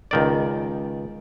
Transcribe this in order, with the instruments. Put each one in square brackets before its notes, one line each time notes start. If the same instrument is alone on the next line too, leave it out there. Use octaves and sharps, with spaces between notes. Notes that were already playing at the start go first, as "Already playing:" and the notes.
[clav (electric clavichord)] C#2 D#3 D5